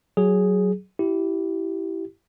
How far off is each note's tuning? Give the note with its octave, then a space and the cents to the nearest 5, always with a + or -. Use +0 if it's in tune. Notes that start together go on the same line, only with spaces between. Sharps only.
F#3 +15 G#4 +0
E4 +0 G4 -20